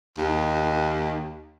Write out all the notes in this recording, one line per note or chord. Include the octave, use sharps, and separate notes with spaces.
D#2